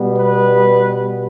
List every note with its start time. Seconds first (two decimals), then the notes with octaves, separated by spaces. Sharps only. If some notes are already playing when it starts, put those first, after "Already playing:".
Already playing: B2 G3 B3
0.16 B4